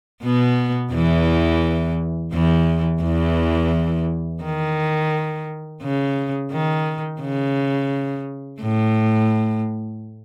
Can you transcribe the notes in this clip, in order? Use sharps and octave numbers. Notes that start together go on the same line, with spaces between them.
B2 B3
E2 E3
E2 E3
E2 E3
D#3
C#3
D#3
C#3
A2